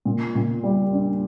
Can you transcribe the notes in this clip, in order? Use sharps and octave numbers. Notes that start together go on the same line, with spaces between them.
A#2
A#2
G3
D4